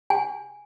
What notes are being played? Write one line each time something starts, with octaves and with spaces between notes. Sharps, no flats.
G#5